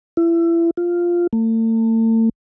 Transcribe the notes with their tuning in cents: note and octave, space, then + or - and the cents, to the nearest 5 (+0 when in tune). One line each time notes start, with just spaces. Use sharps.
E4 +30
F4 -5
A3 +40